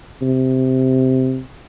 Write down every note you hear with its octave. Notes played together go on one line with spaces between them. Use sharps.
C3